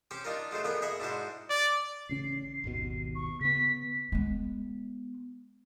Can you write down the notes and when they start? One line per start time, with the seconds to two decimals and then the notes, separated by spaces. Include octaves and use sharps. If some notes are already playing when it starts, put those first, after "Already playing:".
0.11 C4 C#4 G4 G5
0.25 D4 D#4 F4 A#4
0.51 F#3 G#3 A3 C5
0.64 F2 A#2 B3 G#4 A#4 G5
0.82 G#4 D#5 E5 F#5 G#5 B5
1.00 G#2 D4 E4 F#4 C5 A5
1.50 D5
2.09 A1 C#3 C#4 C7
2.64 G#1 D#2 B2
3.15 C#6
3.41 C#3 B3 B6
4.12 G#3 B3